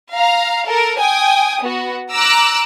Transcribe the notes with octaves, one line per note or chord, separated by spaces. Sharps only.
F5 A#5
A4 A#4
G5 G#5 D#6
B3 F#4
A#5 D6 E6 F#6